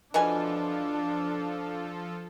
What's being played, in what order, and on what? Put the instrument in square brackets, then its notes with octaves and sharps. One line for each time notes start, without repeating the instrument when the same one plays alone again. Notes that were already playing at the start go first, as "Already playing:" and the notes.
[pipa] B2 E3 G#5 [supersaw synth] F3 F4 A4 [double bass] D4